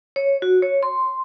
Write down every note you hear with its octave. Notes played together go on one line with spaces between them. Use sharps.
C#5
F#4
C#5
C6